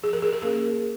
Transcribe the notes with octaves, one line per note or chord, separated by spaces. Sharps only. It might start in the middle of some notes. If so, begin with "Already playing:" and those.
F3 G#4
A#4
G#4
A#4
A#3 C#4 G#4